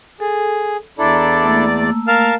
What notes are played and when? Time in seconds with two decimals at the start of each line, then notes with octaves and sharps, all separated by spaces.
0.20 G#4 A4
0.99 E2 D4 E4 A4 D5 A#5
1.43 A3 A#3 E6
2.08 A#4 F5 A5 F6